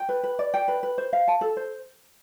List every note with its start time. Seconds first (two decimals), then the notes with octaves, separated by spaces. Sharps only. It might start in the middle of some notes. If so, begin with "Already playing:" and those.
Already playing: G5
0.09 B4
0.23 B4
0.39 D5
0.54 G5
0.68 B4
0.83 B4
0.98 C5
1.13 F5
1.28 A5
1.41 A4
1.57 C5